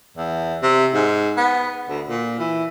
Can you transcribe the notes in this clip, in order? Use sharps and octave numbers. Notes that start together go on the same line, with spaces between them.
E2
C3
G#2
B3
D2
A#2
E3